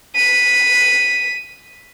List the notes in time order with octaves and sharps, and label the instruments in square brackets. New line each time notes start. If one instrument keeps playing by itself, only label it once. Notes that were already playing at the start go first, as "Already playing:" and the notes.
[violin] B6 D#7